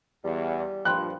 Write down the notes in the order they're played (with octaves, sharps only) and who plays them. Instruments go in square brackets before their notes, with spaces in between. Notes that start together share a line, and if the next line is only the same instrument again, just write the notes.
[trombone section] E2 [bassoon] G3
[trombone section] G2 A#2 F3 [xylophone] G5 B5 C6 [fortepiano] F#6